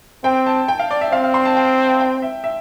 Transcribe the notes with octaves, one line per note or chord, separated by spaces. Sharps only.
C4 G5
A5
G5
F5
D5
E5
C4 F5
F5
C6
A5
G5
G5
E5
E5